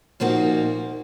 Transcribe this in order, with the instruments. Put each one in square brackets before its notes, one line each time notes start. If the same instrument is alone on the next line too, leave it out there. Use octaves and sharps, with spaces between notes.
[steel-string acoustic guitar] A#2 F3 A#3 D#4 F#4